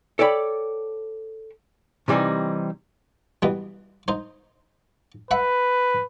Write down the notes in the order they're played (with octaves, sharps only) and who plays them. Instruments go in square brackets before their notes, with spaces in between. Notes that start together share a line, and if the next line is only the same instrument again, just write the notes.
[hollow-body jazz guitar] A4 C#5 D5 G5 A#5 B5
C3 E3 G3 C4 D#4
[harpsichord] B2 E3 G3
D#4 C5
[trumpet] B4 [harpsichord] E5 F#5 B5